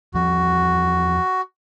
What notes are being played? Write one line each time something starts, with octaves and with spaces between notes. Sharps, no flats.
E2 F3 G3 F#4